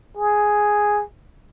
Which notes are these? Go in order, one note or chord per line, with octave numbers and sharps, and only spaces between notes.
G#4